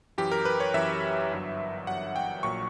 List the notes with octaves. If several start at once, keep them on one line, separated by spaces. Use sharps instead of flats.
F#2 E3 G4
A#4
B4
C#5
F#2 E3 E5
G1 G2 F#3
G1 G2 F#3 F#5
G5
A#1 A#2 F#3 C#6